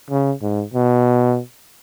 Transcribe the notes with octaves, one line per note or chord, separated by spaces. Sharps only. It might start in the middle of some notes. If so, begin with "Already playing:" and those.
C#3
G#2
B2